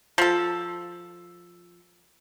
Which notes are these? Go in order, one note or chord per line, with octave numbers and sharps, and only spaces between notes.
F3 A4